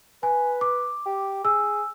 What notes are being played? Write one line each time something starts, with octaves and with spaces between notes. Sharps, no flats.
B4 G#5
D6
G4
G#4 E6